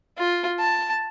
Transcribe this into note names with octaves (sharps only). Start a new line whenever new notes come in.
F4
A5